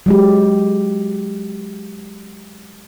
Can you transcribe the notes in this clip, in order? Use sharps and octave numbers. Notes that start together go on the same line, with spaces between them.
F#3 G#3 G4